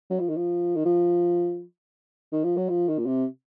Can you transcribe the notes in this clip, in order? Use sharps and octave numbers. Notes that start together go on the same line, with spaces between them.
F#3
F3
D#3
F3
D#3
F3
D#3
F3
F#3
F3
D#3
A#2
C3